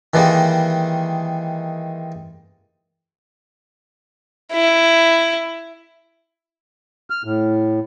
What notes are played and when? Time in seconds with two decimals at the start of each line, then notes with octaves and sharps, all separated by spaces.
0.14 D#3 E3 G3 G#3 A#3
4.53 E4
7.10 F6
7.25 A2